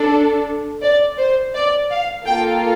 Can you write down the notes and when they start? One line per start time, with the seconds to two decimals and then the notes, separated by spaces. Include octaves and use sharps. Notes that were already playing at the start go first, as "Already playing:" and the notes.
Already playing: D4 A4
0.83 D5
1.18 C5
1.55 D5
1.91 F5
2.26 A#3 F4 A4 G5